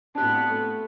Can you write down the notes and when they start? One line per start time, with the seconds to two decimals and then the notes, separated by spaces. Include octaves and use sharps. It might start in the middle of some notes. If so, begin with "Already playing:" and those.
0.15 A2 B3 C4 D4 G4 A5 F#6
0.50 A3